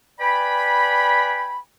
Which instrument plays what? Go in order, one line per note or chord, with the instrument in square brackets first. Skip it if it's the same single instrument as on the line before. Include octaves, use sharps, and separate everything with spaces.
[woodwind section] B4 D5 G5 G#5 B5